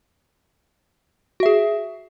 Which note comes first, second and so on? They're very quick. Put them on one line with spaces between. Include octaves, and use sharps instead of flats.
F#4 E5 G#4